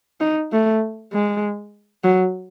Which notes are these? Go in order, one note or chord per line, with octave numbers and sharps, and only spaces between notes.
D#4
A3
G#3
F#3